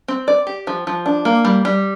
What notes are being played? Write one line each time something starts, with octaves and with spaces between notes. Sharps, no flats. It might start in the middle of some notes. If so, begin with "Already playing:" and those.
C4
D5
G4
F3
F3
D4
A#3
G3
G3